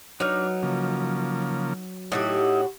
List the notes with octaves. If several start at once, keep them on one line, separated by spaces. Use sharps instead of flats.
F#3 D4 D#4 B4 C#5 F6
C#3 F3 A#3
A2 D#4 E4 F#4 G4